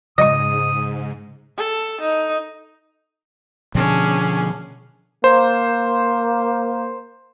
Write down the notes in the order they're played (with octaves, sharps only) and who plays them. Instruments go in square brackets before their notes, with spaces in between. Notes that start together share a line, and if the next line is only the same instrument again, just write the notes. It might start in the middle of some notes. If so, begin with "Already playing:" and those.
[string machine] G#2 [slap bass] C#3 [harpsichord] D#5 C#6 [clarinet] D#6
[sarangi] A4
D#4
[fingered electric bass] B2 D3 F3 [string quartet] C#4 D4 G#4
[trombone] A#3 [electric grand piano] C5